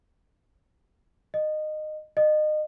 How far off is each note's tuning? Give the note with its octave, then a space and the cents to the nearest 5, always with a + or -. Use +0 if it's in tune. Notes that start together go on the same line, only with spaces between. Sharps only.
D#5 -20
D#5 -30